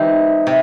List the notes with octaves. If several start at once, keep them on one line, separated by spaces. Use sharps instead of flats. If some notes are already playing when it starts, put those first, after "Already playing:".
Already playing: E3 G#3 C4 D#4 G4
C3